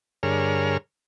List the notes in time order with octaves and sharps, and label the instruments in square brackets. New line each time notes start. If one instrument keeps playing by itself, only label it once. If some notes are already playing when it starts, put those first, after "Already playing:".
[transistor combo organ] G2 D3 G#4 A#4 C#5 F6